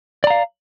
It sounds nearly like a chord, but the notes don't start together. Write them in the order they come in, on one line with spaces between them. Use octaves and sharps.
D5 A#5 F5